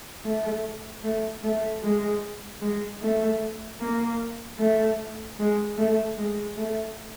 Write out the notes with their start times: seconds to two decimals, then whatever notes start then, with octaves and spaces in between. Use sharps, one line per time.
0.25 A3
1.04 A3
1.44 A3
1.83 G#3
2.62 G#3
3.02 A3
3.80 A#3
4.59 A3
5.39 G#3
5.78 A3
6.18 G#3
6.57 A3